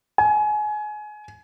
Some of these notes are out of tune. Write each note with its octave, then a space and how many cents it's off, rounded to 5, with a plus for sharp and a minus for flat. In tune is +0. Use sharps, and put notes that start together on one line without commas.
G#5 +25